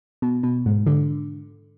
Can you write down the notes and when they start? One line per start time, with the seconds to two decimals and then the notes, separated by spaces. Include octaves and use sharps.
0.22 B2
0.43 B2
0.66 G#2
0.87 D3